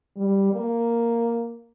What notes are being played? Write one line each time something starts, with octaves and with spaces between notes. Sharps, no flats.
G3
A#3